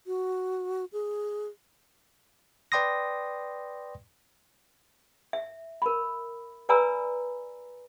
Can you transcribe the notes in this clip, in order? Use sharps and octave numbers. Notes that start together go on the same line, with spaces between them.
F#4
G#4
B4 D5 G5 C6 D#6 A#6
E5
A#4 B5
B4 D5 G#5 A#5 B5 E6